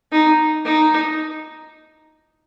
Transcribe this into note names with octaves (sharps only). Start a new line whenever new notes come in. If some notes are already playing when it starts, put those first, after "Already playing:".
D#4
D#4